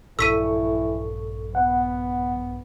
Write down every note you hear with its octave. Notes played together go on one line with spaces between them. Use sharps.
A#1 G2 E3 A4 C#6 E6 B6 D#7
B3 F#5